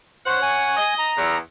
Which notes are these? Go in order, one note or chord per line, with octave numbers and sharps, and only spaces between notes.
C#4 C5 C#5 F#5
G#5
D#5
A#5
E2